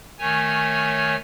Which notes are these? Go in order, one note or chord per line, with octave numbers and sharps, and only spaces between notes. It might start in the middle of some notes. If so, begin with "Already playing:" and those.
D#3 A3 C#5 G#5